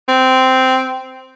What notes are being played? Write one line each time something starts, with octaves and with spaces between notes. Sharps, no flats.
C4